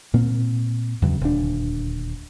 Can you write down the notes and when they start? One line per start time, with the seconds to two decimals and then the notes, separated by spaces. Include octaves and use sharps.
0.14 A#2 A#3 C4
1.02 E2 G2 C#3 F#3
1.21 D#1 D2 D4